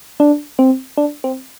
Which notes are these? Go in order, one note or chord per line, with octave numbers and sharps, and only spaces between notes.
D4
C4
D4
C4